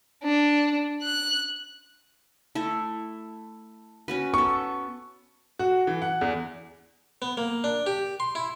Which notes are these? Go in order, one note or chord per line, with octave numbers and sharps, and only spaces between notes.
D4
F#6
A3 E4 A4
C#4 F#4 B4
B3 A4 C#6
F#4
E3
F#5
E2
B3
A#3
D4
G4
C6
E4